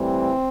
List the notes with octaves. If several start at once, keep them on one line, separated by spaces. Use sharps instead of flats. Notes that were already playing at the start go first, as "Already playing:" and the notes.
Already playing: A2 E3 G3 C4